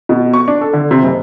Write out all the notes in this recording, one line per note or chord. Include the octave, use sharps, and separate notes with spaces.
B2
C#6
D4
A4
D3
C3
F#1